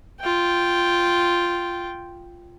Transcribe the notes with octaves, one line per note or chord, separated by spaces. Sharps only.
F4 G5